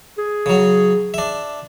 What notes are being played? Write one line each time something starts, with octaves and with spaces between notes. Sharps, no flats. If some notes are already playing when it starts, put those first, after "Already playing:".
G#4
C#3 F#3
D4 E5